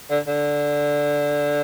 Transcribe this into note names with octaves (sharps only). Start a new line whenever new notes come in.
D3
D3